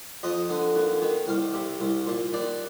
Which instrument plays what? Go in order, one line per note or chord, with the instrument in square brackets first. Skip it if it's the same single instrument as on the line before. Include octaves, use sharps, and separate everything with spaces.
[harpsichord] F2 D#5
D3
D#2
D#3
C2 F5
C3
C2
A#2
D#2 D5